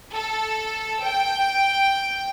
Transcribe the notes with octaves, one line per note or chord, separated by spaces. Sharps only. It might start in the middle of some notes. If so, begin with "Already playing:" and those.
A4
G5